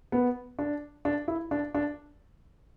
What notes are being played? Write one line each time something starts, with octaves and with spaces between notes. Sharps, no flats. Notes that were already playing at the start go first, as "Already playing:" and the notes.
B3
D4
D4
E4
D4
D4